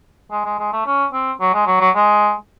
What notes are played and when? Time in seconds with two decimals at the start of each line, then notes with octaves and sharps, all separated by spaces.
0.31 G#3
0.45 G#3
0.59 G#3
0.73 A3
0.86 C#4
1.13 C4
1.41 F#3
1.54 G#3
1.67 F#3
1.80 F#3
1.95 G#3